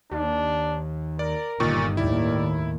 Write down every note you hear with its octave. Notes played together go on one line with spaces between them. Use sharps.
D#2 D4
A#4 D5
G1 A#2 D#3 C#6
D#2 A2 E4 D5